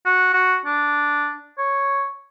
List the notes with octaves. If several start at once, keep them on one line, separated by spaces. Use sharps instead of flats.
F#4
F#4
D4
C#5